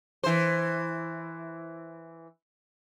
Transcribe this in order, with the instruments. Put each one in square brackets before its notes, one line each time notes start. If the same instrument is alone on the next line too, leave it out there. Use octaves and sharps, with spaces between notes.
[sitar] E3 C5